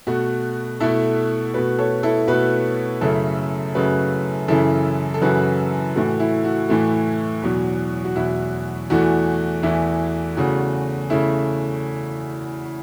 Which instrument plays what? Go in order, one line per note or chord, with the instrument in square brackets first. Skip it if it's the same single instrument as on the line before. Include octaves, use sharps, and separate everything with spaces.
[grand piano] B2 A3 F#4
B2 A3 E4 A4
B2 A3 F#4 B4
A4 C#5
E4 A4
B2 A3 F#4 B4
F#2 C#3 A3 E4 A4
F#2 C#3 A3 F#4 B4
F#2 C#3 E3 E4 A4
A4
F#2 C#3 E3 F#4 B4
A2 E3 A3 F#4
E4
F#4
A2 E3 A3
E2 B2 F#3
F#4
E2 B2 F#3 E4
E2 E3 A3 F#4
E2 E3 A3 E4
E2 C#3 A3 F#4
C#3 A3 E4